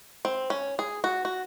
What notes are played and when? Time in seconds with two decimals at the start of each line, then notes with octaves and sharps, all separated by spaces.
0.25 C4
0.50 C#4
0.79 G#4
1.04 F#4
1.25 F#4